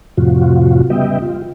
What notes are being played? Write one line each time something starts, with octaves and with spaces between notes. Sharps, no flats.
F2 A2 C3 F3 F4 F#4
C#3 G3 B3 D#5 E5 G5
F4